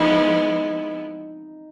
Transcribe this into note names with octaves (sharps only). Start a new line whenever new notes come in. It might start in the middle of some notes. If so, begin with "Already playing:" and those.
Already playing: F3 G#3 B3 D#4 E4